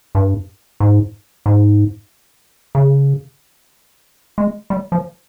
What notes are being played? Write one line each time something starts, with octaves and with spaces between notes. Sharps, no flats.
G2
G#2
G#2
C#3
G#3
G3
F3